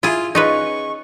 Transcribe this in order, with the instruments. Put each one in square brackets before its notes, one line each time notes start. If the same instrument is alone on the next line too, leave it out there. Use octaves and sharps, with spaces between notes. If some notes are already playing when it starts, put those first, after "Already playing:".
[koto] E4 G#4 [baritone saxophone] F4
[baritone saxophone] C#4 [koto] D#4 F4 B4 [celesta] G#4 D#5 [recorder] C#6